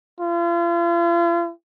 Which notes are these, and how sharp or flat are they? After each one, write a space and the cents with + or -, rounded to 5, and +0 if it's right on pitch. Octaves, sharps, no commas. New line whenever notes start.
F4 -40